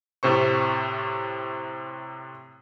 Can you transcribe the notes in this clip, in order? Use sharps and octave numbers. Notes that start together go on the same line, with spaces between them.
A2 C3 C5 C#6